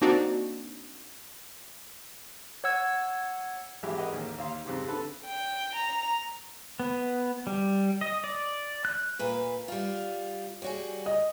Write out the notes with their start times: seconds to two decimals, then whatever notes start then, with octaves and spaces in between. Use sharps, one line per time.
0.01 A#3 C4 D4 D#4 F#4 D5
2.64 C#5 F#5 E6 G#6
3.83 G#1 E3 F#3 G#3 G4 E5
3.98 G#4 A#4 B4 D#5 F#5
4.12 A1 D#2
4.38 D#2 F5 C6
4.65 F2 G#2 C#3 G3
4.88 D3 A4 B4
5.26 G5
5.76 A#5
6.80 B3
7.47 G3
8.01 D#5
8.24 D5
8.85 F#6
9.19 D2 A#2 B4
9.68 G3 F4
10.62 G3 F#4 G#4 C#5
11.06 D#5